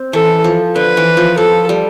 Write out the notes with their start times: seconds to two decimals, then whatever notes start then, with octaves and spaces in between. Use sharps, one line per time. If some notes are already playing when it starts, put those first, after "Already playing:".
Already playing: C4
0.13 E3 A4
0.44 F3
0.76 D3 B4
0.97 E3
1.17 F3
1.37 F3 A4
1.69 G3